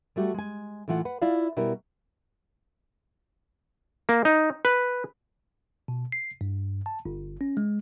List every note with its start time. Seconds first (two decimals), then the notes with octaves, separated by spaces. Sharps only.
0.16 G3 A3 F#4 G4
0.34 G#3 G#5
0.88 A2 E3 A3 F4 F#5
1.05 B4 F#5
1.22 E4 F4 D5 F5
1.57 B2 G3 E4 A#4
4.09 A#3
4.25 D#4
4.65 B4
5.88 B2
6.12 C7
6.41 G2
6.86 A5
7.05 G1
7.41 C#4
7.57 G#3